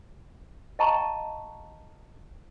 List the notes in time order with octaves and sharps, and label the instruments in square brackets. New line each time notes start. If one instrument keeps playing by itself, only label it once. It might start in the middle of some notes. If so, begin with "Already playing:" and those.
[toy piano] D#5 F5 G5 A5 A#5 C#6